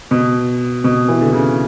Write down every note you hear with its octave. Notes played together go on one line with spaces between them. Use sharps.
B2
B2
E3
D3
C#3